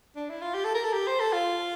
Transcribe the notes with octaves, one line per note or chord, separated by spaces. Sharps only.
D4
E4
F4
G4
A4
A#4
A4
G4
C5
A4
F4